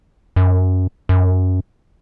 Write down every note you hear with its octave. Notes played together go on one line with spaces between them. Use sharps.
F#2
F#2